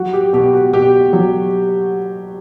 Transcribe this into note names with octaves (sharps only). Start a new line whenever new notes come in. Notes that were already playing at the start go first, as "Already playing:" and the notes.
Already playing: F#3 F#4
G4
B2 G4
F#4
B2 G4
F#3